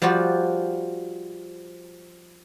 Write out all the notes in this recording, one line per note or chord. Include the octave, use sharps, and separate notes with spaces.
F3 G3 F4 F#4 D5